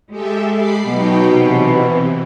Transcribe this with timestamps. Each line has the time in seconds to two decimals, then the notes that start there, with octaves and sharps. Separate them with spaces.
0.10 G#3 G4 A4 E5
0.52 B5 D6 C7
0.87 B2 F#3 D#4 G5
1.25 C3 E3